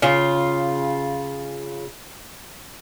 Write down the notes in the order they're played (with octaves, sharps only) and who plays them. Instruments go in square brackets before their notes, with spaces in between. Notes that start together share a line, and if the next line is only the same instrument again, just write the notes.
[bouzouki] C#3 F4